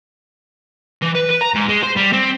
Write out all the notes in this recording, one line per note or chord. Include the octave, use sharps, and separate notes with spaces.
E3
B4
B4
A#5
G#2
G#3
C5
G3
C4